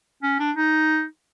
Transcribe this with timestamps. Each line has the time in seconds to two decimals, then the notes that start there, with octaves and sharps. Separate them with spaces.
0.23 C#4
0.39 D4
0.56 D#4